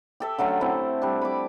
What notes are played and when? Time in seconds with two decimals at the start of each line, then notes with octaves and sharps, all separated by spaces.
0.20 G4 A4 E5
0.38 D3 F#3 A3 C#4
0.61 C4 E4
1.02 G3 D4
1.21 B5 D6